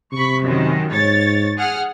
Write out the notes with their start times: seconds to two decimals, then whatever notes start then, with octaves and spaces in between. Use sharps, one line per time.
0.12 C3 B5 C#6
0.42 F#2 D#3
0.91 G#2 C#5 A6
1.57 G#4 F#5 F6